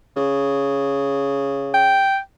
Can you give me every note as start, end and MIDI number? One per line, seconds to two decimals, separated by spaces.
0.16 2.14 49
1.74 2.19 79